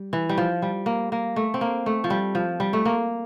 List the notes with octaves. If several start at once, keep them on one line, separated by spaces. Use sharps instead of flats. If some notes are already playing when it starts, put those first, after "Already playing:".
Already playing: G3
E3
G3
F3
G3
A#3
A#3
A3
C4
A#3
A3
F3
G3
F3
G3
A3
A#3